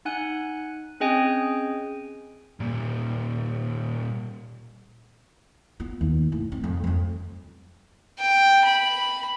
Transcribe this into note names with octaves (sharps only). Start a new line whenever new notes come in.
D#4 F#5 G#5 F#6
C4 C#4 G#4 D#5 G5 G#5
A#2 G3
B3 F4
D#2
A2
C4
F2
F2 F3
G5
B5